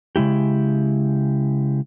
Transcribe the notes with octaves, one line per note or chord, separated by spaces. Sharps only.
C#3 G#3 E4 G4